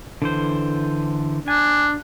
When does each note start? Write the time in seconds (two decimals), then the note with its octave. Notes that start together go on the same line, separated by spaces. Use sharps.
0.22 D3 E3 C5
1.48 D4 G#5